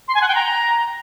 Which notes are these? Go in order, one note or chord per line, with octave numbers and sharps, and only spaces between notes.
C6
G#5
F#5
G5
A#5